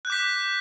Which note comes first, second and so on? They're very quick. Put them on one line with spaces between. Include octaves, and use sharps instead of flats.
F#6 G6 D6 B6